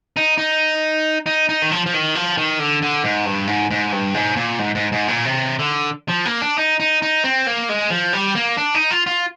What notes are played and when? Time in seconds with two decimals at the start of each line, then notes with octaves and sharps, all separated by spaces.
0.17 D#4
0.38 D#4
1.26 D#4
1.49 D#4
1.62 D#3
1.72 F3
1.86 F3
1.94 D#3
2.15 F3
2.37 D#3
2.59 D3
2.82 D3
3.04 G#2
3.25 G2
3.47 G#2
3.71 G#2
3.92 G2
4.14 G#2
4.36 A#2
4.59 G#2
4.75 G#2
4.92 G#2
5.08 A#2
5.25 C3
5.59 D3
6.08 F3
6.25 A#3
6.41 D4
6.58 D#4
6.80 D#4
7.02 D#4
7.24 C4
7.47 A#3
7.69 G#3
7.90 F3
8.13 G3
8.35 A#3
8.57 D4
8.74 D#4
8.91 F4
9.07 F4